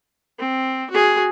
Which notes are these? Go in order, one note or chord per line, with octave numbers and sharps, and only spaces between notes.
C4
F#4 G#4